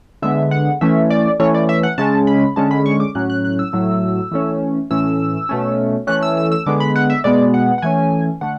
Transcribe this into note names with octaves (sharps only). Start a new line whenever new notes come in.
D3 G#3 B3 E5
F#5
E3 A3 C#4 E5
D5
E3 A3 C#4 C#5
D5
E5
F#5
C#3 G#3 C#4 A5
B5
D3 G#3 C#4 A5
B5
C#6
D6
A2 F#3 C#4 F#6
F#6
F#6
E6
A2 F#3 A3
E3 A3 C#4
A2 E3 A3 C#4 E6
B2 A3 C#4
E3 A3 C#4 F#6
E6
E6
E6
D3 G#3 B3 D6
B5
F#5
E5
B2 G#3 B3 D5
F#5
F#5
E3 A3 C#4 G#5
D3 A3 F#5